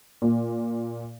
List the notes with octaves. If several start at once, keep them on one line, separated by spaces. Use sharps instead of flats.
A#2